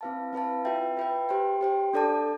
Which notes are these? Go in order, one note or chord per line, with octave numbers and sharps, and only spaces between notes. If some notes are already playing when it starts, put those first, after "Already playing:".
C4 E4 B4 F5 A5
C4 E4 B4 F5 A5
F4 B4 E5 G5
F4 B4 E5 G5
G4 C5 G5
G4 C5 G5
D4 A4 D5 A5